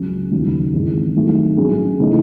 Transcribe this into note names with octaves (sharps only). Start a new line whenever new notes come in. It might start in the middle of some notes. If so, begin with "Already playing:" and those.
Already playing: C#2 C#3 F#3 C#4
D#2 C#3 F#3
G#1 G#2 E3 G#3
G#1 G#2 F#3 A3
A2 F#3 A3 C#4 G#4
C#3 E3 A3 D#4